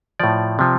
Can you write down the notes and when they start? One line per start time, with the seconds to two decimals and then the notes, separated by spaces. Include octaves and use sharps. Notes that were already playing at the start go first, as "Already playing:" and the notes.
0.20 A2 F3 D5
0.59 C3 F3